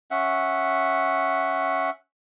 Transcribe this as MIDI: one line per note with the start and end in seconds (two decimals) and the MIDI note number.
0.11 1.90 61
0.11 1.90 76
0.11 1.90 78